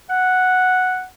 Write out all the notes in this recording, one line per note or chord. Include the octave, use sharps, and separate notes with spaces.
F#5